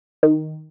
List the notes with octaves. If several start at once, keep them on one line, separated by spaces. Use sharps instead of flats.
D#3